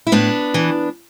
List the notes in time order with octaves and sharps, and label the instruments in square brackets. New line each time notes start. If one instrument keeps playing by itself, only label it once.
[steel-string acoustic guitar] E4
A2 B3 D4
E3